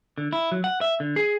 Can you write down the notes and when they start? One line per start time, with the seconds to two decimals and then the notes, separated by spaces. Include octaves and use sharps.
0.18 D3
0.33 E4
0.52 F#3
0.64 F#5
0.81 E5
1.00 D3
1.16 G#4